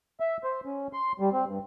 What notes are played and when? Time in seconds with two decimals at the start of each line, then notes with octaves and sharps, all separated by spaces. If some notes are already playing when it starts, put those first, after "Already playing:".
0.20 E5
0.44 C5
0.66 C#4
0.93 C6
1.20 G3
1.33 C4
1.47 G2